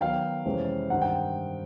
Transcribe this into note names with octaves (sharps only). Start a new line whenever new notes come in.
D#3 F#3 B3 F5 G5
F2 C3 E3 G#3 C#4
G2 D#3 G3 C4 D#4 F#5
G5